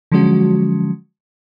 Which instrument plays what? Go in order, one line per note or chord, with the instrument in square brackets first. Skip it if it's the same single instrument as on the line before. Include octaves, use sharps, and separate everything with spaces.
[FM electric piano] D3 F3 F#3 G#3 C#4 F#4